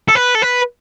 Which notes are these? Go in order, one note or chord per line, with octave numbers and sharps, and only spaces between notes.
A4
B4
A4
B4